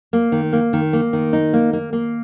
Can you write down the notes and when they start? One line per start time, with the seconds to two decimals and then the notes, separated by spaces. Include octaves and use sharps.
0.13 A#3
0.32 D#3
0.53 A#3
0.73 D#3
0.93 A#3
1.13 D#3
1.33 D#4
1.53 A#3
1.73 A#3
1.93 A#3